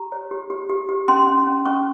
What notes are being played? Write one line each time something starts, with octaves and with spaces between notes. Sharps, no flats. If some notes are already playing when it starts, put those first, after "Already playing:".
Already playing: G4 A#5
C#5
G4
G4
G4
G4
C#4 C6
C#4
C#4
C#4 C#6